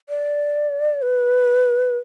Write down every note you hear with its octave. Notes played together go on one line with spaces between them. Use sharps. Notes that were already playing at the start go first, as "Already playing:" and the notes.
D5
B4